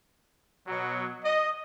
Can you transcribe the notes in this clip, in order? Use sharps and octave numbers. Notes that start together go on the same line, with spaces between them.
B2 F#3
D#5